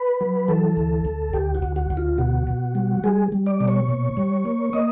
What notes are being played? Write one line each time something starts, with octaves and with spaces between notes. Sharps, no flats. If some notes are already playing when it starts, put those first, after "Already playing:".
Already playing: B4
F#3
E3 A4
D2
D2
D2 G4
F#4
D2
F#4
D2
F4
B2 F#4
B2
G3
G3 G#4
G3
D5
B2
C#5
A#2
G3
A#3
A#3 D#5